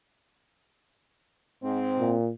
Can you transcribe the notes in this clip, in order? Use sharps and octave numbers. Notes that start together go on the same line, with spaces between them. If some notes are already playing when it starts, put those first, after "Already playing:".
G#2 C4
A#2